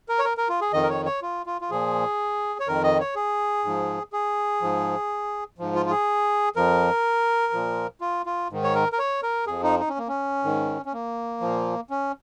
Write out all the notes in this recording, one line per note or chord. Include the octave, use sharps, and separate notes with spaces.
A#4
C#5
A#4
A#4
F4
G#4
F2 D#3 D#5
A#4
C#5
C#5
F4
F4
F4
A#2 F3 G#4
C#5
F2 D#3 A#4
D#5
C#5
G#4
G#2 F3
G#4
G#2 F3
G#2 F3
F4
F4
G#4
F2 F3 A#4
A#2 F3
F4
F4
G#2 D#3
C#5
A#4
A#4
C#5
A#4
F2 F3 G#4
D#4
D#4
C#4
A#3
C#4
G#2 D#3
C#4
A#3
A#2 F3
C#4